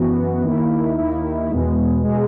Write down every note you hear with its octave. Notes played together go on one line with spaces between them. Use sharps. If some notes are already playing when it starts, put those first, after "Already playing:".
Already playing: F#2 E3 B3 F#4
D#2 D#3 A#3 E4
D#2 D#3 A#3 E4
E2 B2 G#3
B2 G#3